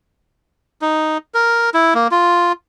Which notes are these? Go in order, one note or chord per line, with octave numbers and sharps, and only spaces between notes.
D#4
A#4
E4
A#3
F4